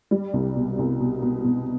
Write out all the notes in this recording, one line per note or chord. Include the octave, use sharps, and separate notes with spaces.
G3
C2
B2
C2
B2
B2
B2